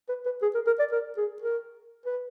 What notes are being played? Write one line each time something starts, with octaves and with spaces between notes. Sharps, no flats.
B4
B4
G#4
A#4
A#4
D5
A#4
G#4
A#4
B4